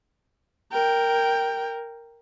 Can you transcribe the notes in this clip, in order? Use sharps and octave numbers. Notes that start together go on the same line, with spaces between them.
A#4 G5